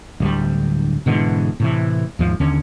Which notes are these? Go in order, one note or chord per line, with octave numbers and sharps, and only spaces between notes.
D1 D2 G3
G#2 B2 D3 E3
A2 C3 E3
D#2 G#2 F3
D#2 D3 C#4